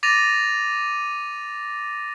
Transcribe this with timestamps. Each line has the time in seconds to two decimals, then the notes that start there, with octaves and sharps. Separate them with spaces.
0.03 D6 A6 A#6 D#7 F7